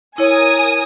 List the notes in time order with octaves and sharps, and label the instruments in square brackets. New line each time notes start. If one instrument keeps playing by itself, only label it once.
[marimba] E4 C#5 [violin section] A#4 G#5 D#6